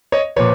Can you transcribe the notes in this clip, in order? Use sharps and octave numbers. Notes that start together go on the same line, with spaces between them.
C#5 D#5
A#2 F3 B4 C#5